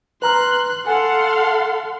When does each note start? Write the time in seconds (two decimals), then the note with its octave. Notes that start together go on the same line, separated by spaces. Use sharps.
0.22 B4 A#5 C6 F6 F#6
0.86 A4 F5 F#5 G#5 C6